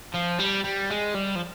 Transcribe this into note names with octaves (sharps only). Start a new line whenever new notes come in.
F3
G3
G3
G#3
G3
F3